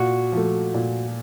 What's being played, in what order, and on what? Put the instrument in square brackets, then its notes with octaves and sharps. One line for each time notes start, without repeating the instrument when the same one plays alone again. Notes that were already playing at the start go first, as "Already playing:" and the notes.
Already playing: [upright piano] A#2 [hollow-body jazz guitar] F#4
[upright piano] F3 A3
A#2